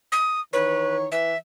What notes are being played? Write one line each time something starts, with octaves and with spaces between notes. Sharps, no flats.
D#6
D#3 E3 B4 C#5
E3 E5